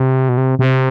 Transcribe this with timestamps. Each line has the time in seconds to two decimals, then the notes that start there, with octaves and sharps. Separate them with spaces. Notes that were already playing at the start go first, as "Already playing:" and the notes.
Already playing: C3
0.29 B2
0.37 C3
0.59 C3